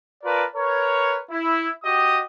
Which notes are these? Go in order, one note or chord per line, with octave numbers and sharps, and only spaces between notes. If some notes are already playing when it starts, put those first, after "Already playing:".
F4 A#4 B4 D5 A5
A#4 B4 C#5
E4
F#4 G4 D#5 D#6